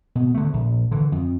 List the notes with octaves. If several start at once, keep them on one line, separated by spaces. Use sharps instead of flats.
B2
D3 A3
A#1
D3 E3
F2